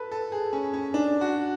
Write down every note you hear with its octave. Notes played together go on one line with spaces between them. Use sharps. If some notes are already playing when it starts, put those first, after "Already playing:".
Already playing: A4 B4
A4
G#4
C#4
C#4
D4
F#4